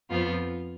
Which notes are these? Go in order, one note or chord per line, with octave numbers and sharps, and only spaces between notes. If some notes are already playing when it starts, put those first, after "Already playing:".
F2 F3 B3 F4